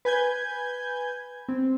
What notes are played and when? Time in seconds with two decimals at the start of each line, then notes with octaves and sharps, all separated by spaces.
0.05 B4 G#5 G6 G#6
1.48 C4